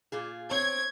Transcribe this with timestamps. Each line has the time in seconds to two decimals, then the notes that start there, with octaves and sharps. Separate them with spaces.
0.12 A#2 F4 G#4
0.51 C4 C#5 G#6